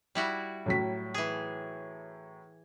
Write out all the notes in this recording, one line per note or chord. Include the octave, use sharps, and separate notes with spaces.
G3 E4 F#4
A2 F#3 B6
E3 G#4